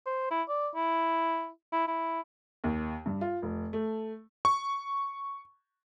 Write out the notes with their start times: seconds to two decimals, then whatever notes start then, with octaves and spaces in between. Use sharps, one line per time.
0.06 C5
0.31 E4
0.49 D5
0.75 E4
1.73 E4
1.87 E4
2.64 D#2
3.06 G2
3.21 F4
3.42 F1
3.73 A3
4.45 C#6